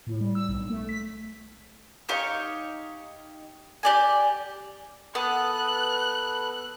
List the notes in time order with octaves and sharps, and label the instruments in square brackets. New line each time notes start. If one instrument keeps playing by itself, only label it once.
[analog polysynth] A2
G3
E6
B1
A3
B6
[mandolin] D#4 G4 C#5 F5
G4 D5 G#5
[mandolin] B3 [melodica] A4 B4 [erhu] F#6